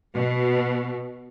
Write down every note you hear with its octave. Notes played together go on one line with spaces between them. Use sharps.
B2